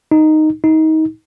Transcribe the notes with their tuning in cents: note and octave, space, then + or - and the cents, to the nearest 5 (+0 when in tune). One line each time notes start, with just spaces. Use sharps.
D#4 -5
D#4 +25